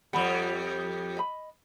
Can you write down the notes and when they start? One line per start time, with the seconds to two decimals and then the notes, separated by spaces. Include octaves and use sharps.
0.13 F2 G3 F#5 B5
1.17 D#5 B5